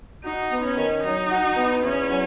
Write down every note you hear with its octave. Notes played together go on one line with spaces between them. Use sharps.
D#4 F#4
B3
C#4
D#3
F#3 D#4
F#4
B3
E2 C#4
F#3